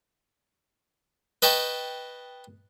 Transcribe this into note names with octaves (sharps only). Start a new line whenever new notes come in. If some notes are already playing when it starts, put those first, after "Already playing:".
B4 D#5 G5 A5 C#6